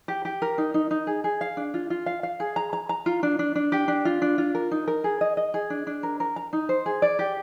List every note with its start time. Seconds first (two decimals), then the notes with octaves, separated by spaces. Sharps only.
0.08 G4
0.25 G4
0.42 A#4
0.58 D#4
0.74 D#4
0.91 D#4
1.07 G#4
1.24 G#4
1.41 F5
1.57 D4
1.74 F4
1.90 F4
2.06 F5
2.23 F5
2.40 G#4
2.56 A#5
2.73 A#5
2.89 A#5
3.06 F4
3.23 D4
3.39 D4
3.55 D4
3.72 G4
3.88 D4
4.05 F4
4.22 D4
4.38 F4
4.55 A#4
4.71 D#4
4.88 A#4
5.04 G#4
5.21 D#5
5.37 D#5
5.54 G#4
5.70 D4
5.87 D4
6.03 A#4
6.20 A#4
6.36 A#5
6.53 D#4
6.69 C5
6.86 G#4
7.02 D5
7.19 G4